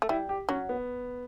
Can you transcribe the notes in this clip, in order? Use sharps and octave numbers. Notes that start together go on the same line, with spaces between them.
A3
G3 E4
G4
F#3 C#4
B3